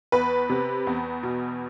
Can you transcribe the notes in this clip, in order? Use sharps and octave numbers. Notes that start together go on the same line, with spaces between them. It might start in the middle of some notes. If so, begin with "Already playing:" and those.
E2 B4
C3
E2
B2